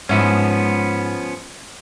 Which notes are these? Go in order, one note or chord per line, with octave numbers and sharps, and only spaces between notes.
G#2 F3 B3 C#4 E4